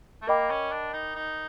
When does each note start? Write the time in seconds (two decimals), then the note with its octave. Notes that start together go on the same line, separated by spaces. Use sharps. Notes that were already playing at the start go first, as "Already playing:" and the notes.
0.22 A3
0.27 A#3 A#4 D#5 G5 B5 D6
0.50 C#4
0.72 D4
0.93 D#4
1.16 D#4